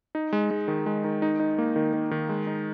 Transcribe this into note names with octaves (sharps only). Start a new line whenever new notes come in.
D#4
G#3
G#3
D#3
G#3
D#3
D#4
D#4
A#3
D#3
D#3
D#3
G#3
D#4